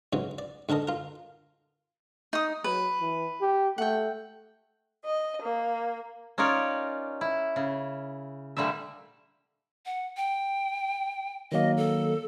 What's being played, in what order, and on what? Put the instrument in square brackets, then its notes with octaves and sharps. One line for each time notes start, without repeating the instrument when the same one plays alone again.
[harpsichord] G#2 C#3 E3 F#3
D5
G#2 D3 A4 A#4 D#5
F4 A#4
[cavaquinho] D#4 D#6
[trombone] F#3 [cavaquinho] B4
[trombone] E3
G4
[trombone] A3 [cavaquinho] F#5 G5
[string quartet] D#5
A#3
[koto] C#4 D#4 F4 A#4 C#5 D5
E4
C#3
A#2 D3 G3 A3 E5
[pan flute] F#5
G5
[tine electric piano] D#3 F#3 A#3 [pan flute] D#5
[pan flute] A4